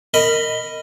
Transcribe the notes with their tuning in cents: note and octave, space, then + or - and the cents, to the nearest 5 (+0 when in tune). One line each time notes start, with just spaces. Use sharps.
A#4 -25 D#5 +0 B5 +0